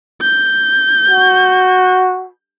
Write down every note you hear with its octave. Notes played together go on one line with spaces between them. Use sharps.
G6
F#4